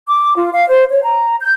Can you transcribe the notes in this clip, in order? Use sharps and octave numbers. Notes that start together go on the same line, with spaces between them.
D6
F4
F5
C5
C#5
A#5
G6